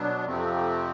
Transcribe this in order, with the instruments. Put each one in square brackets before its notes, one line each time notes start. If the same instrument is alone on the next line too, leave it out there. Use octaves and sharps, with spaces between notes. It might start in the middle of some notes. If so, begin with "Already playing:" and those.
Already playing: [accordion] B2 F#3 B3 D4
F2 C3 F3 A3 C4